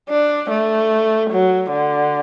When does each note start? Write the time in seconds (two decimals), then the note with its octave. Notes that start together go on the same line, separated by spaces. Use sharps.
0.10 D4
0.50 A3
1.31 F#3
1.71 D3